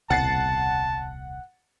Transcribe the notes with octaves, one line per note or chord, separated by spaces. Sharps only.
D#1 C2 B2 F#5 A5 A6 C7